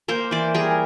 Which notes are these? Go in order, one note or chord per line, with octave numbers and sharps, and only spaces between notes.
A#3 A#4 C5
E3 C5 D5
G3 G#4 A#4